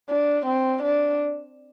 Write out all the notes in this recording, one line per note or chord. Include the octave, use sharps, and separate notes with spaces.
D4
C4
D4